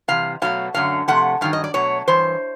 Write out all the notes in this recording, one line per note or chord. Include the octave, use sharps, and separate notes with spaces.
C3 E3 G3 F5
B2 F#3 A3 F5
F#2 D3 F#3 A3 F5
C3 F3 A3 F#5
G2 D#3 F#3 F5
D#5
D5
B2 F#3 A3 C#5
G2 E3 C5